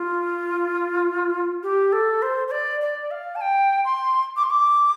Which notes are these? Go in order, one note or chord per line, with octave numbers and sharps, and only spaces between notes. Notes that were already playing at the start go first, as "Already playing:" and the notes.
Already playing: F4
G4
A4
C5
C5
D5
D5
F5
A5
G5
C6
D6
C6
D6